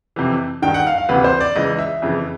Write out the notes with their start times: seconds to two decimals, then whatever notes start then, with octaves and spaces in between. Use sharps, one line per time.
0.16 F2 C3 E3
0.62 G2 D#3 G5
0.74 F#5
0.87 F5
0.98 F5
1.09 D2 C3 E3 B4
1.24 C5
1.41 D5
1.56 C#2 C#3 E3 D#5
1.79 E5
2.02 F2 C#3 E3